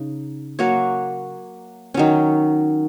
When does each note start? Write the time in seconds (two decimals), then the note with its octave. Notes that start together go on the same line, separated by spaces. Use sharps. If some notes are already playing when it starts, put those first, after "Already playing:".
Already playing: C#3 D#4
0.59 F#3 A#3 F#4 C#5
1.94 D#3 F#3 C#4